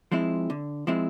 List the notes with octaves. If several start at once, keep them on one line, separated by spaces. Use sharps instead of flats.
F3 G#3 C4 E4
D3
F3 G#3 C4 E4